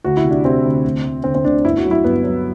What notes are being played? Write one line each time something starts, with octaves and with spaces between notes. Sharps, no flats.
D2 F#4
E4
C3
D4
C3 C4
D2
D2
D2
D3 C4
C4
D2 D4
G1 E4
F#4
F#3
E4
G2 B3
F#3